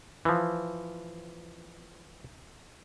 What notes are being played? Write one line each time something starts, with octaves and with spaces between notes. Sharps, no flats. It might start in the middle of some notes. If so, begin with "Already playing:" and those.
E3 F3